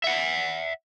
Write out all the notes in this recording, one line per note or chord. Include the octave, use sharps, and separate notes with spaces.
E5 F#5